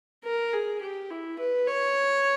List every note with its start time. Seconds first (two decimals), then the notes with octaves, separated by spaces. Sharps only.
0.24 A#4
0.53 G#4
0.81 G4
1.10 E4
1.39 B4
1.67 C#5